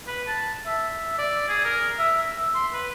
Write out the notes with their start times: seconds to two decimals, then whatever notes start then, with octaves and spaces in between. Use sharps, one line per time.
0.07 B4
0.27 A5
0.66 E5
1.18 D5
1.48 G#4
1.65 A#4
1.99 E5
2.55 C6
2.73 B4